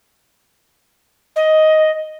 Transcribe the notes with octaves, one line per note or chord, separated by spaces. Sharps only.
D#5